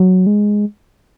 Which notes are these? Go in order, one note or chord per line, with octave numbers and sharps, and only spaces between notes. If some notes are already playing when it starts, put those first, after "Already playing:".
Already playing: F#3
G#3